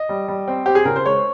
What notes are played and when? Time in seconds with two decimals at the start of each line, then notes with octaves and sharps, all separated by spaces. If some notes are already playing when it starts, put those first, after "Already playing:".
Already playing: D#5
0.09 G3
0.28 G3
0.48 C4
0.66 C4 G4
0.75 G#4
0.85 C#3 A#4
0.96 C5
1.05 G#3 C#5